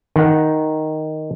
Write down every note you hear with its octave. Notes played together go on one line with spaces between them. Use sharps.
D#3 F#5